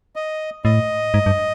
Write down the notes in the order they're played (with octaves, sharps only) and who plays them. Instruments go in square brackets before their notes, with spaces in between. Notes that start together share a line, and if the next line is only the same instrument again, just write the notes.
[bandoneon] D#5
[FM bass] A2 [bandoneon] D#5
[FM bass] G#2
G2